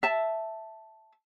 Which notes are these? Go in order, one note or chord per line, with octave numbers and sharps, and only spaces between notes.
E5 A5